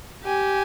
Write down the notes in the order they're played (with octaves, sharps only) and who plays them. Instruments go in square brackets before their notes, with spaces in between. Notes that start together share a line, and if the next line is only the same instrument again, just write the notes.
[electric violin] G4 [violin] G#5